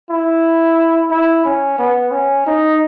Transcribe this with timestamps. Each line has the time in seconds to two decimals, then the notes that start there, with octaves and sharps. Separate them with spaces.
0.10 E4
1.11 E4
1.45 C#4
1.78 B3
2.12 C#4
2.46 D#4